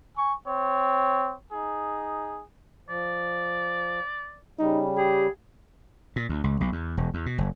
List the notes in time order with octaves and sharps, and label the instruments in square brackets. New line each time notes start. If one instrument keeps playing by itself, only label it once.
[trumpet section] G#5 C#6
C4 C#5
D#4 G#4
[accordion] F3 [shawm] D5
[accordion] C#3 G3 [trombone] D#4
[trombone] G4 [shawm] G#4
[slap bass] A#2
D2
C#2
B1
E2
E1
E2
B2
F#1